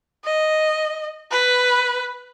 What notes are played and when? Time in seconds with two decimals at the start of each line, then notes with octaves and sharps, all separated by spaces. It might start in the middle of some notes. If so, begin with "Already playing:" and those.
0.25 D#5
1.31 B4